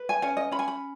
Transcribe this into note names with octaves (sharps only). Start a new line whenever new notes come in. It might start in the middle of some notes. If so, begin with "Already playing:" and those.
Already playing: B4
G#5
C#4 G#5
D#5
C#4 B5
G#5
B5